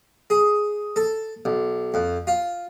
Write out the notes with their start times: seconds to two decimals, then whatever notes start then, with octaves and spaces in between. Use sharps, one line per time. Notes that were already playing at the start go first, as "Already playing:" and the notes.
0.30 G#4
0.96 A4
1.45 B1
1.94 F2
2.27 F4